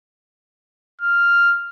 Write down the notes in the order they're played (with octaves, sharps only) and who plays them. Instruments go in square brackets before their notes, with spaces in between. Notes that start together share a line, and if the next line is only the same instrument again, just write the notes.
[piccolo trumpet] F6